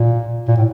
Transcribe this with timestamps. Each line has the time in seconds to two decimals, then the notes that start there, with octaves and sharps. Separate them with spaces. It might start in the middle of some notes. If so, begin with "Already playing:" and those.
Already playing: A#2
0.48 A#2
0.57 A2